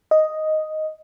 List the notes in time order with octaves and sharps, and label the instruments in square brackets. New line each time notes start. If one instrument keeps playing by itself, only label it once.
[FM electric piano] D#5